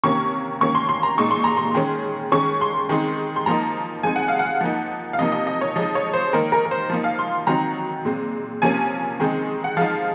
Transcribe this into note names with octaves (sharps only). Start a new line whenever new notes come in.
C3 D#3 A#3 C#4 C#6
D#3 A#3 C#4 C#6
C6
C6
A#5
A#2 G#3 D#4 C#6
C6
A#5
C6
D#3 G#3 C#4
D#3 G#3 C#4 C#6
C6
D#3 G#3 C4 D#4
C6
F3 A#3 D#4 A#5
F3 G#3 C4 D#4 G#5
F#5
F5
F#5
F3 A#3 D#4
F5
C3 F3 A#3 D#4 D#5
D#5
D#5
C#5
F3 G#3 D#4 D#5
C#5
C5
D#3 A#3 D#4 A#4
A#4
A#4
C5
F3 A#3 D#4
F5
C6
D#3 F#3 C4 D#4 A#5
A#2 G#3 C4
C3 F3 A#3 C#4 G#5
D#3 G#3 C4 D#4
F#5
F3 G#3 D#4 F5